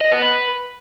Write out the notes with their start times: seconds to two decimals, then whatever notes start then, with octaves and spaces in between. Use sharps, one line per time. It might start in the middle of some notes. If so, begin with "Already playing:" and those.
0.01 D#5
0.11 B3
0.22 B4